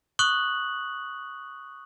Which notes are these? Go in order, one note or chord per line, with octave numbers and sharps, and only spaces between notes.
C#6 D#6 F#6 F#7